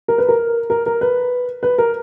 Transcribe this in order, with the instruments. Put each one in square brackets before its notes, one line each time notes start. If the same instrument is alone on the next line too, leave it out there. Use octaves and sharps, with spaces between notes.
[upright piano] A#4
B4
A#4
A#4
A#4
B4
B4
A#4